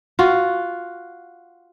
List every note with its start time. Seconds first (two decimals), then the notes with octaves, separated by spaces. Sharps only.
0.19 F4 F#4